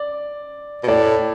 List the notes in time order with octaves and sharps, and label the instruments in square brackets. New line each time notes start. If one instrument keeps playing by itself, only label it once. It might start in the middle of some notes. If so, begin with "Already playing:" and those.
Already playing: [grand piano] D5
[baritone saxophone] B2
[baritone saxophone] A2 [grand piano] D5